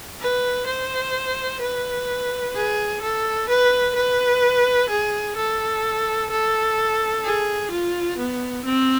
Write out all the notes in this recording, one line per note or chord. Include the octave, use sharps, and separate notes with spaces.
B4
C5
B4
G#4
A4
B4
B4
G#4
A4
A4
G#4
F4
B3
C4